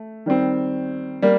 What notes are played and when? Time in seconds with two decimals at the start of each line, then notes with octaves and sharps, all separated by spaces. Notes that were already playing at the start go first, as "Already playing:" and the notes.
Already playing: A3
0.26 D#3 G3 C4
1.22 G3 A#3